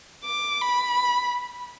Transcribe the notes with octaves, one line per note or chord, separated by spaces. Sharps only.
D6
B5